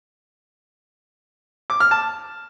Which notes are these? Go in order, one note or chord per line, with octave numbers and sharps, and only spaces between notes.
D6
F6
A5